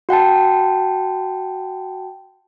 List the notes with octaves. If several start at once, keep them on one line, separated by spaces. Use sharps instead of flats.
F#4 F#5 G5 A5